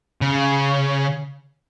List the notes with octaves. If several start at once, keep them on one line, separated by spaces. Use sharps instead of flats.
C#3